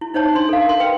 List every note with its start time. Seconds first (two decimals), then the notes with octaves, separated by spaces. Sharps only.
0.01 E4
0.14 D#4 C5 C#5 A5
0.35 D4 C6
0.49 A4 F5
0.67 A#4 C6
0.80 B4 G5